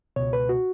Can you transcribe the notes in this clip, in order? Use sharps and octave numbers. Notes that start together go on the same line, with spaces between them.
C#2 B2 C#5
B4
F#4